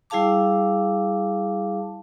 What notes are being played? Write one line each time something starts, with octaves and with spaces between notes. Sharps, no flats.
G3 E4 G#4 F5 A5 D6